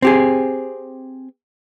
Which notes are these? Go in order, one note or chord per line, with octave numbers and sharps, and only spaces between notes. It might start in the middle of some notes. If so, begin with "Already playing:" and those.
C4 G4 G#4